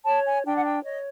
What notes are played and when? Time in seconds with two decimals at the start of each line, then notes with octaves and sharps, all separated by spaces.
0.05 C#5 A5
0.25 G#5
0.45 D4 G5
0.56 F#5
0.64 G5
0.84 C#5 D#5